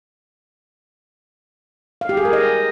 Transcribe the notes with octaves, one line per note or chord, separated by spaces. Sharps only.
F5
G4
G#4
A#4
D#5